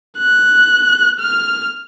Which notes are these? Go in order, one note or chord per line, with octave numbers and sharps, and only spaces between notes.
F#6
F6